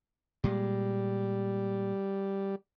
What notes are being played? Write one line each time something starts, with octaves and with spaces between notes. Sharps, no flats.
A#2 G3 G#3